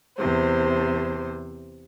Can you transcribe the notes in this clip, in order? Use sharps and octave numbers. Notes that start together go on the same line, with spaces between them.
E2 C3 C5